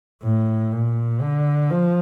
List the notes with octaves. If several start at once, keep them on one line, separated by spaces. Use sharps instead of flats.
A2
A#2
D3
F3